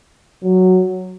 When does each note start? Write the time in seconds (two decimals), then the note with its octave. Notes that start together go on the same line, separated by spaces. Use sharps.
0.43 F#3